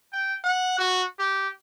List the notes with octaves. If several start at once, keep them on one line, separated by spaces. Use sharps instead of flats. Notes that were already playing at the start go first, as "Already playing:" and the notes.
G5
F#5
F#4
G4